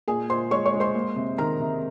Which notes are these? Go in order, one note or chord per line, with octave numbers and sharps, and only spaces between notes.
A#2 G#4 G#5
A#2 C5 C6
G#3 C#5 C#6
C#5 C#6
G#3
C5 C6
A#3
C3
D#3 A#4 A#5
C3